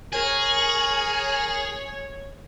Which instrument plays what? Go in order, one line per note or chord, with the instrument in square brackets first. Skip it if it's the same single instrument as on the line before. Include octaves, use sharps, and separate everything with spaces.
[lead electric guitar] G#4 [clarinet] A#4 [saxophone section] C#5